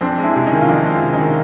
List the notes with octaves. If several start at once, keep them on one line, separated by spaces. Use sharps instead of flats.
F2 C4 D4
G#3
D4 E4
C3
C#4 D#4
D#3
F4
F2 D4 E4
G#3
C3
C#4 D#4
D#3